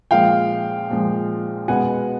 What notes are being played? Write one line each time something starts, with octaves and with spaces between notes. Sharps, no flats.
A#2 F3 G#3 F5 G5
A#2 F3 G#3
B2 G#3 B3 F#5 G#5